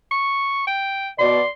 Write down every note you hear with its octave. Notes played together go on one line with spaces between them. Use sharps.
C#6
G5
B2 D5 C6